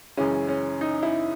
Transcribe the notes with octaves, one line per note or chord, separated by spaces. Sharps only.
F#2 C#3 E3 G#3 C#4
C#4
D#4
E4